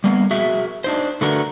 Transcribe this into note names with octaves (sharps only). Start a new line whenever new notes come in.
G3 A#3 B3
F#4 G#4 A#4 E5
D4 D#4 C5
D3 A3 D4 F#4 A#4 B4